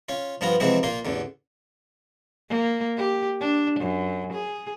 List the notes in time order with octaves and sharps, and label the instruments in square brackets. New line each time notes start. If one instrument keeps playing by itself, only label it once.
[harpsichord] C#4 F4
G2 F3 B3 F4 A#5
C3 E3 F3 G#3 C4 F#4
A#2 A#3 F4 C6
A1 E2 D3
[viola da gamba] A#3
G4
D4
F#2
G#4